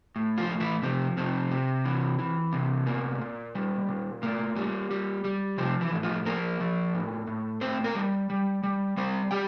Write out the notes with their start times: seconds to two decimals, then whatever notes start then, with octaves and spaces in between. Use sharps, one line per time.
0.16 A2
0.38 F3 F4
0.49 A2
0.60 E3 E4
0.82 C3 F3 C4
1.17 C3 F3 C4
1.51 C3
1.85 E3
2.19 E3
2.53 C3
2.86 A#2 A#3
3.21 A#2
3.55 G3
3.88 A#2
4.22 A2 A#3
4.57 G3
4.91 G3
5.24 G3
5.58 C3 F3 C4
5.81 E3 E4
5.92 A2
6.03 F3 F4
6.26 F3 A#3 A#4
6.60 F3
6.94 A2
7.27 A2
7.61 A2 C4 C5
7.84 A#3 A#4
7.95 G3
8.30 G3
8.63 G3
8.97 G3 C4 C5
9.31 G3 G4 G5